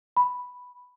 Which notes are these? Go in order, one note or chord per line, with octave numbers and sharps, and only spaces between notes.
B5